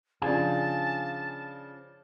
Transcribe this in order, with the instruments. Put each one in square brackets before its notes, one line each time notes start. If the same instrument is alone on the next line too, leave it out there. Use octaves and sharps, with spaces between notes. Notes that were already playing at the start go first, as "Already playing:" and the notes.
[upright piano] C#3 F3 D4 [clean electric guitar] F5 G#5 [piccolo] A5